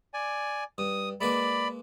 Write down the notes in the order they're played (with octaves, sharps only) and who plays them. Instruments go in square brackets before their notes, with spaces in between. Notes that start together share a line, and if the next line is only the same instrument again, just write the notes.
[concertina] D5 G#5
[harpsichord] G2 [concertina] D#6
[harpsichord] G#3 A#3 B4 [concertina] D5 B5